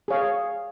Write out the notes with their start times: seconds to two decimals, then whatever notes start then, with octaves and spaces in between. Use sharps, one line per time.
0.08 G#4 C#5 F5